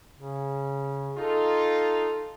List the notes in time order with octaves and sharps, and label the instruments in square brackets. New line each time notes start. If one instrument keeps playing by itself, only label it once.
[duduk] C#3
[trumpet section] D#4 F4 [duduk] A4